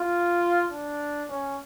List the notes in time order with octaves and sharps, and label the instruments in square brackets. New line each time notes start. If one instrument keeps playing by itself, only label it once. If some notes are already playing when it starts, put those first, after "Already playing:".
Already playing: [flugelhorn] F4
D4
C#4